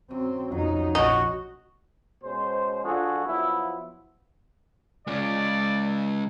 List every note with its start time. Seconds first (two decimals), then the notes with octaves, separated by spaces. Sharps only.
0.11 F#2 C4
0.52 F2 F#3 D#4
0.95 A#1 D#4 F#4
2.24 B2 G#3 C#4 C5
2.84 F3 D4 F4 F#4 G#4 A4
3.26 F3 F#3 B3 E4
5.07 C#3 G#3 D5